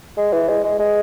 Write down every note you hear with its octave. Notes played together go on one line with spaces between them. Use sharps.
G#3
E3
G#3
G#3
G#3